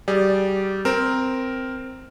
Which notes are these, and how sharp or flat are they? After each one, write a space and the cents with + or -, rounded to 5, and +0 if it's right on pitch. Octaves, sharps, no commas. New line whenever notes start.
G3 -25 G#4 -20 D5 +0
C4 -5 A#4 +0